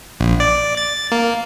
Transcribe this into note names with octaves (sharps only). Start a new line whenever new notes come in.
A#1
D5
A6
A#3